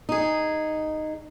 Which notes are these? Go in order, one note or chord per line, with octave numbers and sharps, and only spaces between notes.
D#4 G#4